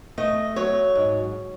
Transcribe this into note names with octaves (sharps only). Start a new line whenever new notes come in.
A3 D#5
F#3 C#5
G#2